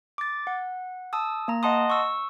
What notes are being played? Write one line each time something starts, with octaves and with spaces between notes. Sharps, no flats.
D6 A6
F#5
A5 D#6 E6
A#3 A#5
D#5 F#5 A5 C6 D#6
C#6 E6